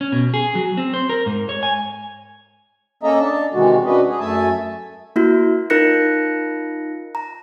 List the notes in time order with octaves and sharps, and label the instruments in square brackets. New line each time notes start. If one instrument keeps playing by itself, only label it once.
[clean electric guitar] C#4
B2
G#4
F#3
C4
C5
A#4
G#2
C#5
G#5
[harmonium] A#3 C#4 A4 D#5 E5 A#5
D4 A5
C3 D#3 E3 G#3 F#4
C#4 D4 F#4 B4 D#5
G#4
F#2 A3 E5 G#5 A5
[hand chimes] A#3 E4 F#4
D#4 F4 A#4 F#6 A#6 C#7
A#5